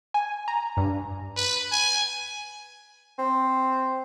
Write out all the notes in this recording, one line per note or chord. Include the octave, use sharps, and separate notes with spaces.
G#5
A#5
G2
B4
G#5
C4